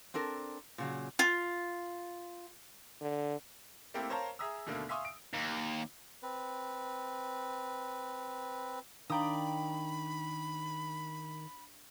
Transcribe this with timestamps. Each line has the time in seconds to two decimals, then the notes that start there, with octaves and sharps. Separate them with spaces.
0.14 C4 D4 A4 A#4
0.78 A#2 C#3 F#3
1.19 F4
3.01 D3
3.94 A3 A#3 C4 E4 G4 A4
4.10 A#4 C5 C#5 F5 A5 A#5
4.39 G#4 E5 A#5 D#6 E6
4.66 D#2 B2 D3 A3 A#3
4.89 E5 F5 G#5 C6 C#6 D#6
5.05 D7
5.34 D#2
6.23 C4 B4
9.10 D#3 D4 D5 F5 G5 A#5 B5 D#6